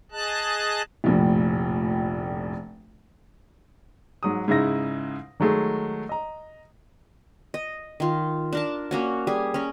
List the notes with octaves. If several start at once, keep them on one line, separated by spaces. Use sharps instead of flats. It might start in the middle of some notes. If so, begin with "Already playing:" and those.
G#4 D#5 A5 F#6
F1 A#1 A2
G#2 F#3 D#6
G#2 C#3 D#4 E4 A#6
D#3 F#3 G#3 A3 G#4
D#5 A#5
D#5
D#3 F4
D4 A#4 A5
A#3 C#4 F#4
G3 G#4
C#4 A#4